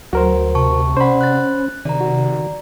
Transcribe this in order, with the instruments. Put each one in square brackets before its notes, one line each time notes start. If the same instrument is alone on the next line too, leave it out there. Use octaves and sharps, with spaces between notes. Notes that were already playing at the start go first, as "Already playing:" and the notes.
[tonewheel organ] D2 [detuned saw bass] F#3 [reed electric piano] F#4 A#4 C5
[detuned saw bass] C3 [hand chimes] A5 C#6
[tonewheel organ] C#4 [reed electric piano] C5 B5 [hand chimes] D5 F#5
[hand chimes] F#6 A6
[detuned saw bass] C3 [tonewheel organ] D#3 [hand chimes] D5 A#5
[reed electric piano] F#4